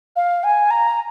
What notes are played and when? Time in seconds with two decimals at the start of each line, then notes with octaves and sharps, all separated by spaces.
0.16 F5
0.44 G#5
0.71 A#5